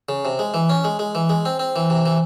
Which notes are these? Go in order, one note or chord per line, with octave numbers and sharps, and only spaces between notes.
C#3
C3
G#3
E3
C#4
G#3
G#3
E3
G#3
C4
C4
E3
C3
E3